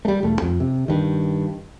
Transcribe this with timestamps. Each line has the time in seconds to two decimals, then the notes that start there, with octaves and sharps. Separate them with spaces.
0.05 G3 A3
0.23 E1 A3
0.42 F2
0.60 C3
0.88 G2 D#3